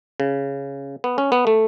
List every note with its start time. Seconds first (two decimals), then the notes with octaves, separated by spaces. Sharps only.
0.20 C#3
1.04 B3
1.18 C#4
1.32 B3
1.47 A3